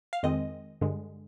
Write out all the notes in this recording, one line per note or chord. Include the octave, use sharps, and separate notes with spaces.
F5
F2 D#3 G#3 C4 D#5
G2 D3 G#3